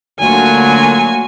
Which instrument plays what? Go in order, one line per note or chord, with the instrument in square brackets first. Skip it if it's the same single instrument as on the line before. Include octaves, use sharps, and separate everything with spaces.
[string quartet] D2 F4 C#5 [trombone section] D3 F#3 [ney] A#3 [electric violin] G#5